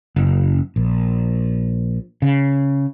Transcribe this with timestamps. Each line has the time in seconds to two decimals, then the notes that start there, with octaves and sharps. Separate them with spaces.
0.16 F#1
0.76 A#1
2.22 C#3